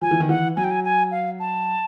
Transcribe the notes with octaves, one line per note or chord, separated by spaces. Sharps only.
F3 G#5
E3
D#3
E3 F#5
F#3 G#5
G5
G#5
G#5
F5
A5